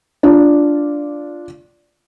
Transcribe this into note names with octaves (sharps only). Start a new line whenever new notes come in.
D4 F4 D5